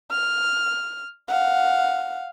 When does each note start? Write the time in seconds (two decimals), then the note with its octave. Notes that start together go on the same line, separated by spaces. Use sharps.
0.11 F6
1.28 F5 F#5